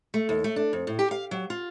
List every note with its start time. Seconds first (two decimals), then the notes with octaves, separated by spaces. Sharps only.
0.14 A3
0.29 D#2
0.44 A3
0.56 D4
0.73 F2
0.87 A2
0.99 G4
1.11 F5
1.31 F#3
1.50 F4